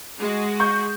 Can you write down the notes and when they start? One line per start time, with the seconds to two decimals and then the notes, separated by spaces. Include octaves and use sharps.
0.18 G#3 F#4
0.60 C#6 G6